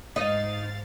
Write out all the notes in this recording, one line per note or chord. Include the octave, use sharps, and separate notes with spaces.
G#2 D#4 D#5 F5 A6